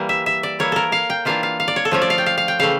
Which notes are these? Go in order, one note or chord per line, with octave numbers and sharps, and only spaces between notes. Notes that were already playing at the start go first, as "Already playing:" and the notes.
Already playing: E3 G3 A#3
E5
E5
D5
E3 A#3 E4 C#5
A4 A#4
F5
G5
E3 A#3 D4 F4 F5
F5
F5
D5
C#5
A4
F3 A3 C#4 F4 C#5
D5
F5
G5
F5
F5
G5
C#3 E3 A3 F5